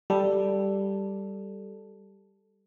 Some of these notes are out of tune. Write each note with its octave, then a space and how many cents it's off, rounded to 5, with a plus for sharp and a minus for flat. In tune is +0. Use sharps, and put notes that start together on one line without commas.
G3 +0 A4 +0